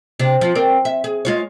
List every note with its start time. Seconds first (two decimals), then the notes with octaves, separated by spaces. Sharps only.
0.19 C3 D4
0.41 F3 F4
0.55 C4 A#4 D5
0.85 E5
1.04 G#4
1.25 G#3 F4 C#5